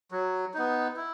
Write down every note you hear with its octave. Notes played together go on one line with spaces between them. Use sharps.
F#3
B3 D#4
E4